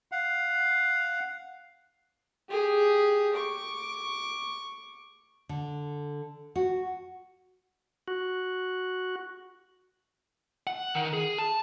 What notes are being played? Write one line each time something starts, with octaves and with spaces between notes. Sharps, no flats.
F5 F#5
G4 G#4
C#6 D6
D3
F#4
F#4
F#5
D#3
G#4
A5